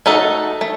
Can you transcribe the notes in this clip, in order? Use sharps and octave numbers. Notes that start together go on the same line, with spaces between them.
A3 D#4 F#4 A4
A3